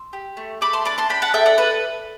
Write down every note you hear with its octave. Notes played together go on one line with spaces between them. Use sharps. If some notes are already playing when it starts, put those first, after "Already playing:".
Already playing: C6 E6
G4
A3
A3 B5 D6
A5 C6
D4 B5 D6
A5 C6
D4 G5 B5
F#5 A5
A4 E5 G5
D5 F#5
A4 B4